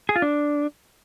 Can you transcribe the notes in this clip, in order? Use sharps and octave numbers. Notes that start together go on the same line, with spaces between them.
G#4
F4
D4